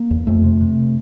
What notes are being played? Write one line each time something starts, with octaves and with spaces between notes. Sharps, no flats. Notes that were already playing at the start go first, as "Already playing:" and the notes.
Already playing: A#3
E2
F2 A3
C3
C3